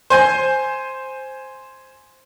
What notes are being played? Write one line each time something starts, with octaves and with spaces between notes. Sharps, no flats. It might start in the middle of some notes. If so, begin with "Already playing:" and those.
C5 G#5 G6